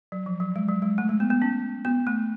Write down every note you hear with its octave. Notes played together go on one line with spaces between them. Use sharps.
F#3
F3
F#3
G#3
F#3
G#3
A3
G#3
B3
B3
C#4
B3
A3